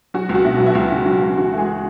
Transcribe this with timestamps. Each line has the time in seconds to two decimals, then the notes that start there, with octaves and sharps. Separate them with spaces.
0.14 F#3 F#4
0.29 C#2
0.35 F#4
0.44 B2 E4
0.60 F#3
0.66 E4
0.75 C#2 F#4
0.91 C#3
1.06 F#3
1.21 C#2
1.37 E3 F#4
1.53 G#3 A3 G#4